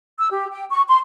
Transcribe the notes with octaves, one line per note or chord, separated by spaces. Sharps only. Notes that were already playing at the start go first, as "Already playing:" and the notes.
E6
G4
G5
C#6
C6